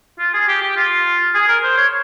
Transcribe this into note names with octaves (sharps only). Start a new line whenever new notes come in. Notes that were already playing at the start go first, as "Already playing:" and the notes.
F4
G#4
G4
G4
F4
G#4
A#4
C5
C#5